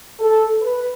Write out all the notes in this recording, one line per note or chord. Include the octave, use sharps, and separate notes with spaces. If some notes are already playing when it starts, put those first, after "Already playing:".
A4
B4